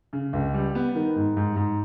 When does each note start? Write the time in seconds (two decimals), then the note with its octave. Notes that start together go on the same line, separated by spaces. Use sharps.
0.13 C#3
0.33 C#2
0.54 G3
0.75 B3
0.95 D#3
1.16 G#2
1.37 G#2
1.56 G#2